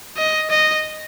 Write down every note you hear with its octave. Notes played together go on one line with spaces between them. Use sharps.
D#5
D#5